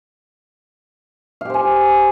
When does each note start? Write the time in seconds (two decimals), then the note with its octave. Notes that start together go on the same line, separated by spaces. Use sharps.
1.41 F5
1.45 G4
1.50 C5
1.54 G#5